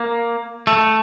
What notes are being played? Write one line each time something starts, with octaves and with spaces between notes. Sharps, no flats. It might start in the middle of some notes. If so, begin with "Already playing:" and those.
Already playing: A#3
A3